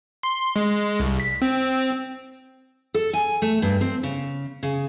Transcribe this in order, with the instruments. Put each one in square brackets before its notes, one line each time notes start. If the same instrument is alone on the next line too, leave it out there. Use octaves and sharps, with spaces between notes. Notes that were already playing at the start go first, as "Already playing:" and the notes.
[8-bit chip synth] C6
G#3
C2
B6
C4
[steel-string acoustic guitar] A4
G#5
A3
G2
C4
C#3
C#3